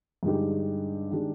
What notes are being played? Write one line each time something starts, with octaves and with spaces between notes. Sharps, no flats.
G2 D3 G#3 D#4 G4
D#3 G#3 D4 G4